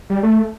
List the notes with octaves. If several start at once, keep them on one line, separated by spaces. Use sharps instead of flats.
G3
A3